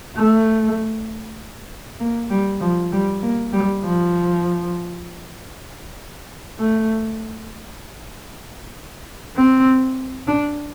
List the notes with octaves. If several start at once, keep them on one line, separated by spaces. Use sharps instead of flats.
A3
A#3
G3
F3
G3
A#3
G3
F3
A3
C4
D4